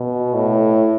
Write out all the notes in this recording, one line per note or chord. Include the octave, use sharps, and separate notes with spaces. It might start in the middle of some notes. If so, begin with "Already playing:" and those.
Already playing: B2
A2